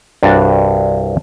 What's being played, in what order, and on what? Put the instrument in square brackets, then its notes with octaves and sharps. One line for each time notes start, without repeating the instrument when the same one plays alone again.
[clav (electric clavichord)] C2 G2 D4 F#4 D5